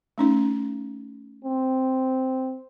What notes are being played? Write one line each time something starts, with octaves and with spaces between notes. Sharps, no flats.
A3 C#4 D#4
C4